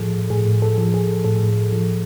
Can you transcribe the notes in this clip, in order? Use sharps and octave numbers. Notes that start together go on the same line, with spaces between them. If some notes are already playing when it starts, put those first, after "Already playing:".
Already playing: A2 F3 G#4 A4
A2 G#4
A4
F3
G#4
A2 A4
F3